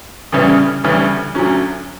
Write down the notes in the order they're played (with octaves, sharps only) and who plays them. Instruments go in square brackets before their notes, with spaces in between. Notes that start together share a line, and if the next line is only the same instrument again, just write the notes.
[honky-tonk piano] D2 C#3 E3 G3 C#4
D2 C#3 E3 G3 C#4
D2 D3 F#3 C#4